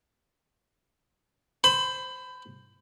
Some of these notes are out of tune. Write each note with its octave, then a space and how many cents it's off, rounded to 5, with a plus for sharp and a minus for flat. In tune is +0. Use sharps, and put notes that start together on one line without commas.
C5 +0 B5 +25